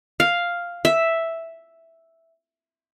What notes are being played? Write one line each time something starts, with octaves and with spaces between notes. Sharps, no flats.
F5
E5